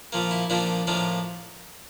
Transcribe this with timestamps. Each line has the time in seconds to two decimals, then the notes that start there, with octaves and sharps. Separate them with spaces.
0.12 A#2 F3 A#3
0.31 E4
0.50 A#2 F3 A#3 D4
0.87 A2 F3 A#3 D4